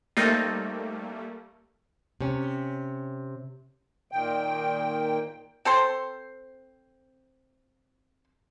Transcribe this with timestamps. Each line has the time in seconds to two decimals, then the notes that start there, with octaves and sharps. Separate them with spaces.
0.17 G3 A3 A#3 C4 D#4 F4
2.21 C3 C#4
4.12 A#2 D#3 G5
5.65 C4 A4 C5